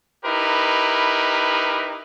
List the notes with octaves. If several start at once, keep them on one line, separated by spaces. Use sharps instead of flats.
D#4 E4 G4 A#4 B4